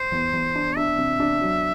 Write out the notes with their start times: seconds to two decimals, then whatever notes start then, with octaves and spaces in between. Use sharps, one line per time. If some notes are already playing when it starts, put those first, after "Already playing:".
Already playing: C5
0.12 E2
0.33 E2
0.55 D4
0.76 D4 E5
0.98 C3
1.20 D4
1.41 F#3